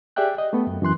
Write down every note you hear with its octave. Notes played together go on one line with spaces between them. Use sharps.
G4 G#4 D5 E5 G5 F#6
D#5
A3 B3
F#2
F#2 E3 C6 F#6